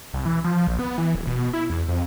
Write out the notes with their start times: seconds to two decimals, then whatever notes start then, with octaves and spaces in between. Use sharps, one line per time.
0.14 C2
0.26 E3
0.44 F3
0.67 A#1
0.79 B3
0.98 E3
1.15 D#1
1.27 B2
1.53 E4
1.70 E2
1.88 F2